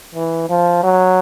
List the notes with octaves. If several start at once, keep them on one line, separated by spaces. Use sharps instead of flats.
E3
F3
F#3